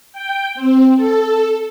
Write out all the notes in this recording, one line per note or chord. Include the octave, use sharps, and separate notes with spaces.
G5
C4
A4